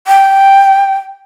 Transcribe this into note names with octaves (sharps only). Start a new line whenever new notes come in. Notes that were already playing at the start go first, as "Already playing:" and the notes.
G5